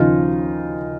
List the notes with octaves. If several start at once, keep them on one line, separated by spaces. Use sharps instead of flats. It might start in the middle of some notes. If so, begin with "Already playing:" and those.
Already playing: D#2 C#3 F3 D#4 F4